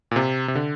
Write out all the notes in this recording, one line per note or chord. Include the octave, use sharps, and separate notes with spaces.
A#2
C3
C3
D3